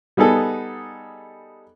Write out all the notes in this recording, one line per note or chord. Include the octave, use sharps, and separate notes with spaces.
G3 B3 D#4 G#4 A4